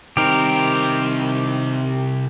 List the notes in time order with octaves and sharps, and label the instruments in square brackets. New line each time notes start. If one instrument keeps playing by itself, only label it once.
[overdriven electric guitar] C2 C4 [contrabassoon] D#3 [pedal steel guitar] G4 A#4